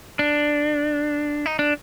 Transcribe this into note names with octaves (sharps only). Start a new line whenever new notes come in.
D4
D#4
D4